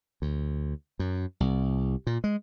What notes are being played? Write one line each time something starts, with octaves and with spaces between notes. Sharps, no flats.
D2
F#2
C2
A#2
G#3